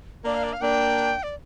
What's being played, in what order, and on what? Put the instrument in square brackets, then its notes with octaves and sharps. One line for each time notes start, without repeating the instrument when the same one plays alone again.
[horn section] A#3 D4 [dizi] D5
[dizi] F5
D5
F5
[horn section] A#3 D4 [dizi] G5
[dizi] D5